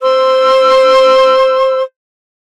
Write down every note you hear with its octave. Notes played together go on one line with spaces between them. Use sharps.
C5 C6 E6